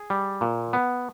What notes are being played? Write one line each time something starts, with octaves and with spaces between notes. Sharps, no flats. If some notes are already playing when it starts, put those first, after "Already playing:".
Already playing: G#4
G3
A#2
B3